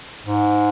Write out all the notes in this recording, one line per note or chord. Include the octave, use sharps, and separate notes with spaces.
G#2